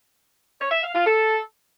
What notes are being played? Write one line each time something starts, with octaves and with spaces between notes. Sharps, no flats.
C#5
E5
F5
F4
A4